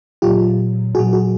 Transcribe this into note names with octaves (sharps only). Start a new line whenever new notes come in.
A#2 F#3 F4 G4
A#2 F#3 F#4 G#4
F#4 G#4